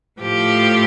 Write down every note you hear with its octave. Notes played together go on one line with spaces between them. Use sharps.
A2 F3 G4